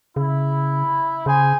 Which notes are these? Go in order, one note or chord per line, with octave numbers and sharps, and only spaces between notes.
C#3 E4
C#3 G#4 C5 G#5